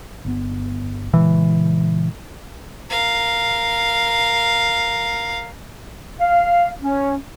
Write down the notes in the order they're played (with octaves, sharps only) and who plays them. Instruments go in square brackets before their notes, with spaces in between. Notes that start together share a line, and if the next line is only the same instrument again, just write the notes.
[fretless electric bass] G1 B3
[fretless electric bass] A#2 C#3 G#3 [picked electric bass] E3
[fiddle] A#4 F5
[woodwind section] F5
C#4